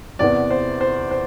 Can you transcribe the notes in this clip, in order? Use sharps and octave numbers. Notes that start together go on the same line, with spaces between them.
E2 C3 E3 B3 D5
C5
C5
C5